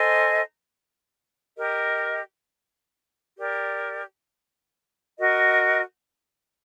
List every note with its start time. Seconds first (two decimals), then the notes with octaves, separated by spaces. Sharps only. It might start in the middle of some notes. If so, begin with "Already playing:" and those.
Already playing: A4 C5 D#5 G#5
1.57 G4 A#4 D#5
3.38 G4 A#4 D5
5.19 F#4 A#4 D#5